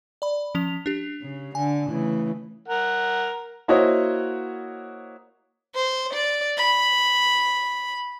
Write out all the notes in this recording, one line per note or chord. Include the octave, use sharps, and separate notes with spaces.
D5 B5
F3 C#4 F7
D4 G4
C#3
D3 G#5
C#3 E3 A3
A#4 F#5
A#3 E4 F#4 C5 C#5 D#5
C5
D5
B5